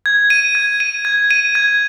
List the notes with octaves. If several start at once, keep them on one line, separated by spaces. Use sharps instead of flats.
G#6
D#7
G#6
D#7
G#6
D#7
G#6